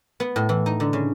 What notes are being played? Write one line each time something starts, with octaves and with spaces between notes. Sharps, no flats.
B3
A2
E3
D#4
D3
C#3